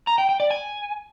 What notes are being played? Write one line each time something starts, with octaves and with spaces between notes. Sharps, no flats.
A#5
G5
G5
D5
G#5